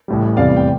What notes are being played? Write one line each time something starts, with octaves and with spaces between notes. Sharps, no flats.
A1 A2 G3
F1 E2 C3 G3 D5 F5
G5